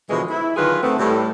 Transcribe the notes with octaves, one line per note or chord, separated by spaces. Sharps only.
B2 D3 E3 F3 G#3
E4
D3 D#3 F#3 F4 G#4 B4
A3 B3 C4
A2 G3